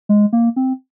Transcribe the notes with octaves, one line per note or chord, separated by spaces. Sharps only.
G#3
A#3
C4